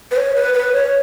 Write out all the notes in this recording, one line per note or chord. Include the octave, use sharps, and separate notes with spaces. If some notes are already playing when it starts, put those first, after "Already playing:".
B4
C#5
B4
B4
C#5